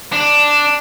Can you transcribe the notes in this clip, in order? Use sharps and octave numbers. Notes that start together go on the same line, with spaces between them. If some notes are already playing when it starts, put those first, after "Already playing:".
D4